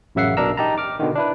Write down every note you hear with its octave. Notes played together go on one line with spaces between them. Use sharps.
A1 F#2 C#3 E5 F#5 C7
B1 B2 D4 A#4 A#5 E6
D#4 G4 A5 A#5
D6 F6
B2 D3 D#3
D4 E4 B4